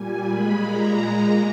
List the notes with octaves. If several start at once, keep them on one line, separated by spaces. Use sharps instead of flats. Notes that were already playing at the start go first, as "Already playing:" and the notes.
Already playing: A#2 G3 G#5
A#2 G#3 B5
A#2 G#3 A#5
A#2 G#3